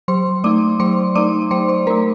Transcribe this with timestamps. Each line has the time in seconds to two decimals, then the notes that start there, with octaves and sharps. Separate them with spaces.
0.08 F#3 C5 C6
0.44 A3 D#4 D5 D6
0.80 F#3 C5 C6
1.15 A3 D#4 D5 D6
1.51 F#3 C5 C6
1.68 C5 C6
1.87 A3 D#4 A#4 A#5